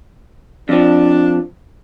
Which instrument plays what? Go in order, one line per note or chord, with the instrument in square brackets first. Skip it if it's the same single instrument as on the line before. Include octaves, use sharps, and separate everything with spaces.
[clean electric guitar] F2 F3 [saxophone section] D4